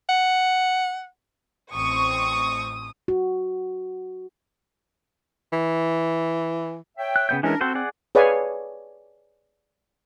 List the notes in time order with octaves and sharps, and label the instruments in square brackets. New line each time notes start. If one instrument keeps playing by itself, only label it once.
[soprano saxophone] F#5
[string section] A1 C4 C#6 [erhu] D#6
[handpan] F#4
[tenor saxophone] E3
[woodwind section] C#5 E5 G5
[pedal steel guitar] F#6
C#3 B3 G6
[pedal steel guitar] E3 G#3 C#4 [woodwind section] D4 A#4
[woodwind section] C4 [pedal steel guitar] F#4 A4 C5
[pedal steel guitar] G#4 D5 F#5
[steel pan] G#4 B4 C#5 D5 F5 G#5